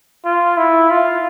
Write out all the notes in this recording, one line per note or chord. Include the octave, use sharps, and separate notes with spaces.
F4
E4
F4